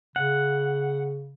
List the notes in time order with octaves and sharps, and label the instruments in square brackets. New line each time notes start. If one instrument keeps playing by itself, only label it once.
[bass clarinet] C#3 [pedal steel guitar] F#5